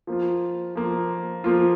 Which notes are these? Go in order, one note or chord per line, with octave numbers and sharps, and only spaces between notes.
F3 A#3 F4
F3 A#3 F4
F3 A#3 F4